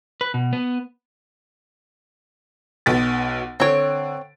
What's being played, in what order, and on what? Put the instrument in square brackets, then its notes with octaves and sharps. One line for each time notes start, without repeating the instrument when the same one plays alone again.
[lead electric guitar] B4
B2
B3
[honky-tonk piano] B1 B2 A6
[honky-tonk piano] D3 D7 [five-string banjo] C4 C#5